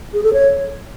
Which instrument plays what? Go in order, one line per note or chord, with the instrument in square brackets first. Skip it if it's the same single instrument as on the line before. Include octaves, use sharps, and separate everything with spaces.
[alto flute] G#4
A4
C#5